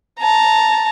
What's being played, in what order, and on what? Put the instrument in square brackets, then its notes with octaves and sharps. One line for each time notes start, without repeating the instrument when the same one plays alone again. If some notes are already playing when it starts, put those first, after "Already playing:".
[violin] A5 A#5